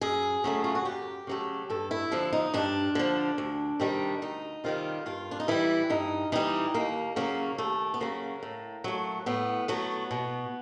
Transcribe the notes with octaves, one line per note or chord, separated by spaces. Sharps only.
F#2 G#4
C#3 F#3 A3
F4
F#4
F#2 G4
C#3 F#3 A3
G2 A4
E4
D3 F3 D4
D#4
G2 D4
D3 F3
D2
C3 D#3 G3
D2 D#4
C3 D#3 G3 F4
G2 F4
D4
D#4
E3 G3 E4
G2 D#4
E3 G3 D#4
D#2 A#3
C#3 F#3 A#3
D#2 A3
B3
C#3 F#3 A#3
A2
F#3 A3
A2 B3
F#3 A3 B3
B2